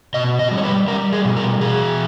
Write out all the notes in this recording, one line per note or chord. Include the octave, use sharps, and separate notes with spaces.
B2 D#5
D#5
G3
C#5
B4
G3 A#4
G#4
B2
A#4
B2 G#4